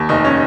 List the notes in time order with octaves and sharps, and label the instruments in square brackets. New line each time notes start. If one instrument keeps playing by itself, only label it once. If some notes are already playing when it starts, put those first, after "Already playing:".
Already playing: [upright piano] D#2
F1 D#4
C#4